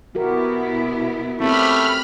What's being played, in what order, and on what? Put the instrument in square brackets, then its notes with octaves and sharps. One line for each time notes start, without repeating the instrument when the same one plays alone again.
[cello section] B2 B3 E4 [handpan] F#4 G4 A#4
[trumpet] A3 [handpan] C4 C#4 G4 [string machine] B5 F6